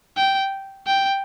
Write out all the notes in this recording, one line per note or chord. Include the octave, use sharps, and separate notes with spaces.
G5
G5